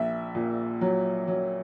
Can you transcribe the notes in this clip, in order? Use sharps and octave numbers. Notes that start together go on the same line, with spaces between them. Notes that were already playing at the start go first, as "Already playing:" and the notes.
Already playing: A#1 E5
A#2
F#3
F#3